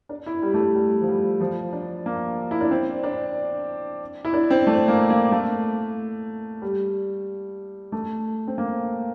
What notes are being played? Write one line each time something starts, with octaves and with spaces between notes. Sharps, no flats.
D4
E4
G3
A3
G3
G3
F3
G3
F3
D4
A#3
E4
D4
C4
D4
E4
D4
C4
A3
A#3
A#3
A3
G3
A3
C4
A#3